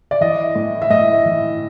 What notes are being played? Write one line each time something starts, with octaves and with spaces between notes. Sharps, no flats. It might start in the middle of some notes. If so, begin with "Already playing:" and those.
D5
E3 D#5
A2
E5
A2 D#5
E3